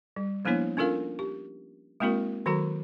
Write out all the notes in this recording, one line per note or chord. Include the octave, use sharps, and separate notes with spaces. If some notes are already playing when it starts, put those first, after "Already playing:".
G3
F3 A#3 B3 D4 E4 C#5
C#4 D4 F4 A4 A#4 F5
G4
G#3 A#3 C4 E4 F#4 A#4
D#3 F#3 F#4 A4 A#5